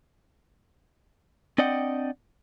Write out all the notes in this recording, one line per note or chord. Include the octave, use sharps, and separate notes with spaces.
C4 D4 D5 D#5 F#5 G5